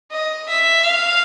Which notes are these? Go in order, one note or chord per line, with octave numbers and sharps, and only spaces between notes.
D#5
E5
F5